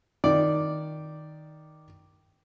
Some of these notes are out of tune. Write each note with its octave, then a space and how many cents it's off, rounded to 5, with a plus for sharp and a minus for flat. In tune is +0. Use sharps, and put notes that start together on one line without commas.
D#3 +0 D5 +0